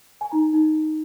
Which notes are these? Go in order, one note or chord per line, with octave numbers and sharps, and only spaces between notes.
G#5
D#4 A#5
D#4